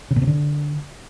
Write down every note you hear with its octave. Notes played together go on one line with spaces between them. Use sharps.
C#3
A#2
C3
D3